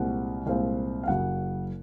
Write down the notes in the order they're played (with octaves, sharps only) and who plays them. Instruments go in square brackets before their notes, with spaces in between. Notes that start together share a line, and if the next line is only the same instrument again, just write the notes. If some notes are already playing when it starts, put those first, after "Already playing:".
Already playing: [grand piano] C2 A#2 G#3 C4 F#5
C2 A#2 G#3 C4 F5
F5
F#1 F#2 C#3 F#3 F#5